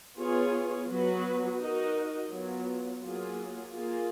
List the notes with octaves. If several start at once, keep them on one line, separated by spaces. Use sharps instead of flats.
B3 F4 G#4 C#5
F#3 B3 F#4 B4
D#4 F#4 A#4 D#5
F#3 B3 F4
F#3 A#3 F4 G#4
A#3 F4 G#4